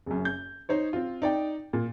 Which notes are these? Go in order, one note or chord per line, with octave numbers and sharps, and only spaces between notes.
F#1 F#2
G6
D#4 C5 C#5
C4 F4
D#4 D5 G5
A#2